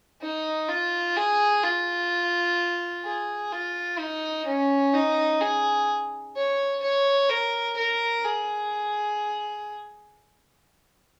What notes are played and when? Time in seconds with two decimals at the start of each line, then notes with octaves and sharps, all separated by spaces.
0.22 D#4
0.68 F4
1.16 G#4
1.63 F4
3.05 G#4
3.52 F4
3.99 D#4
4.46 C#4
4.93 D#4
5.41 G#4
6.36 C#5
6.82 C#5
7.29 A#4
7.77 A#4
8.25 G#4